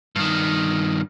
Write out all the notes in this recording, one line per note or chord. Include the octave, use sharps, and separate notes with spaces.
G2 D#3